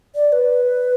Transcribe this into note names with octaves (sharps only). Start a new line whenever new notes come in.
D5
B4